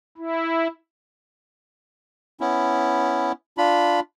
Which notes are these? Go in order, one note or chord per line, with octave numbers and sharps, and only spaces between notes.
E4
B3 C#4 E4
D4 F4 B5